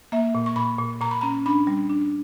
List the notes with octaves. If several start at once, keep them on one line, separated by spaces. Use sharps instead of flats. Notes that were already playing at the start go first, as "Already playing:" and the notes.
A#3 E5
A#2
C#6
A#2 B5
A#2
A#2 A#5
B5
C#4 A#5
D4 B5
G3
D4